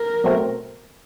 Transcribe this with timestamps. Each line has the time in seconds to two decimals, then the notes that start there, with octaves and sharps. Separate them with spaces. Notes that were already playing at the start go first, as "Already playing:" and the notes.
Already playing: A#4
0.24 B2 F#3 A3 C4